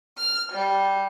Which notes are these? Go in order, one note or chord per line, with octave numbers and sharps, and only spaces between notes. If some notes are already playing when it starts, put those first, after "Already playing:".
F6
G3